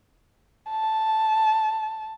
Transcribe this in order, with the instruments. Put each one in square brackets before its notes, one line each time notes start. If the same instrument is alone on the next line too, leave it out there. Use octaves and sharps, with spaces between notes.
[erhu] A5